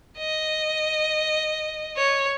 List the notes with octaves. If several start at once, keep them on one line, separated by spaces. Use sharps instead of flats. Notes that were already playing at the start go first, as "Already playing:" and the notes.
D#5
C#5